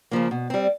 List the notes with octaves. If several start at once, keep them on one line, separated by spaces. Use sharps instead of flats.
C#3 F3 A#3
B2
G3 C4